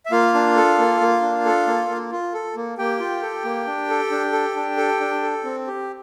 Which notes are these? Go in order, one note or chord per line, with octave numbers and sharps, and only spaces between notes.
E5
A#3 F4 F5
D4
A4
A#3
A#3
D4
A4
A#3
A#3
F4
A4
A#3
A#3 G4 G5
F4
A4
A#3
D4
A4
D4
A4
D4
A4
D4
A4
C4
G4